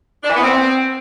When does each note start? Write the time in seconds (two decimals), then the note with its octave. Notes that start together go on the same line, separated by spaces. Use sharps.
0.23 D4
0.30 E3
0.36 B3
0.43 C4